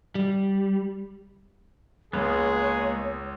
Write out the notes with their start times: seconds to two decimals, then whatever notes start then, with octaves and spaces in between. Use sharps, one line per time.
0.15 G3
2.13 C#2 G#3 A#3 B3 G#4 C#5